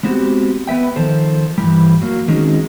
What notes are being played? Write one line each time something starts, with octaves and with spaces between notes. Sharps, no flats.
G#3 B3 C4 E4 F#4 G4
B3 B4 E5 G5
D#3 F3 A4 C5
G2 C3 E3 G3
F#3 A#3
D#3 F#3 G#3 C4 C#4 D#4